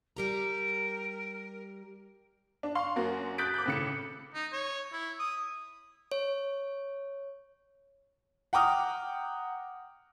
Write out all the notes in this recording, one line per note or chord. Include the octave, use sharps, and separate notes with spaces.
G3 G4 A#4 A#5
D4
F5 C6 C#6
F#2 A#3 F#4
D#6 F#6 G6 A6 B6 D7
D6 F#6 G6
A2 C#3 C#7
D#4
C#5
E4
D#6
C#5
F#5 G5 A#5 D6 D#6 F6